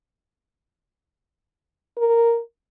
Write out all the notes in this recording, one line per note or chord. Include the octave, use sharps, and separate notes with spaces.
A#4